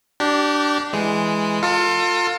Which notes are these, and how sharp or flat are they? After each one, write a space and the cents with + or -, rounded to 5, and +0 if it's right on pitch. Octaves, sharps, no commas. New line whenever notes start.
D4 +0 G4 -30
E3 +0 G#3 +5
F4 +20 A4 +35